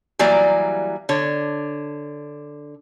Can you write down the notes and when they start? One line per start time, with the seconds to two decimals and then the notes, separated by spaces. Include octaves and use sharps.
0.19 E3 F#3 G3 A#3 D5 A#5
1.09 D3 C#5